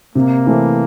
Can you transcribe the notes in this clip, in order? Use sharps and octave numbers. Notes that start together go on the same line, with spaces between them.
C3 A#3
E3 A3 C4